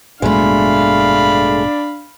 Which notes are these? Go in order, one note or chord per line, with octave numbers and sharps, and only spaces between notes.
A1 G2 B2 G#3 A3 D4 F5 B5